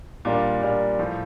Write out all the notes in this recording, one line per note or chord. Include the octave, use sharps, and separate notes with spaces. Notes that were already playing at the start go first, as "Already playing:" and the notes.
A#2 G3 D4 F4 A#4
A#2 G3 D4 F4 A#4
A2 F3